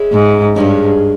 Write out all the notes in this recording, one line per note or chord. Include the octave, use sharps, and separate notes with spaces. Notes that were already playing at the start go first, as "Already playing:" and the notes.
Already playing: G#3 C#4 E4 G#4
G#2
G2 G#3 C#4 E4 G#4